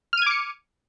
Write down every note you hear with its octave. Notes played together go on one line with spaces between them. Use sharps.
D6 F6 G#6 C#7 D#7